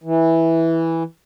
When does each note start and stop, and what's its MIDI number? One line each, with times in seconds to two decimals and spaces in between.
0.03 1.03 52